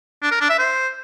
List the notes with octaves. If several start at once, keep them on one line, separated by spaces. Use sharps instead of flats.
D4
A#4
D4
E5
C5